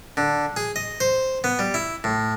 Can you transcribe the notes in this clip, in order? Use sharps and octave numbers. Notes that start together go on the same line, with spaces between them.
D3
G#4
D#5
C5
B3
G3
E4
A2